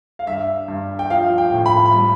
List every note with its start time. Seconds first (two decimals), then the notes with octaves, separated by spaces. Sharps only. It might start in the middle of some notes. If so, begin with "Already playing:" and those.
0.19 F5
0.27 G2 E5
0.68 G2
0.99 G5
1.10 F3 F5
1.38 G5
1.51 A2
1.66 B5
1.86 B5
1.94 G3